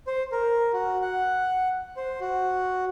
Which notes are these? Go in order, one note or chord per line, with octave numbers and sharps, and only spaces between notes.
C5
A#4
F#4
F#5
C5
F#4